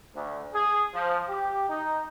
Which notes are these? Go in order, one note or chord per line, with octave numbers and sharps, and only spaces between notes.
D2
G#4
F3
G4
D#4